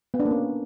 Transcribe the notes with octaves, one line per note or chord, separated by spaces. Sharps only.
B3
D4
A#3
C#4